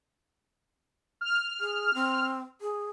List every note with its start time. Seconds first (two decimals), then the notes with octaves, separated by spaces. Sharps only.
1.21 F6
1.60 G#4
1.94 C4
2.61 G#4